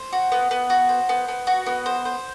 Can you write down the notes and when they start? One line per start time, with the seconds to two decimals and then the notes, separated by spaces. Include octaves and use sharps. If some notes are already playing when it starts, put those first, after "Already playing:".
Already playing: C5
0.13 F#4
0.32 B3
0.51 B3
0.70 F#4
0.89 C5
1.09 B3
1.28 B3
1.47 F#4
1.66 B3
1.86 C5
2.05 C5